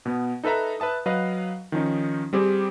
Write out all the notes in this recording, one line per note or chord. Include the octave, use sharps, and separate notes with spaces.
B2 B3
D#4 A4 B4 E5 A#5
B4 E5 A5 D#6
F#3 B4 D#5 F5
D#3 F3 C#4 D#4
G3 C4 G4 G#4